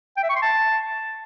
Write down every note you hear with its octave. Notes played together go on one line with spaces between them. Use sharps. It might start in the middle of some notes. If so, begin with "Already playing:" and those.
G5
E5
C#6
C6
A5